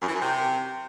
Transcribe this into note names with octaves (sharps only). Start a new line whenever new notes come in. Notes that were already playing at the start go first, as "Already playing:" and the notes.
F#2
E3
F#2
C3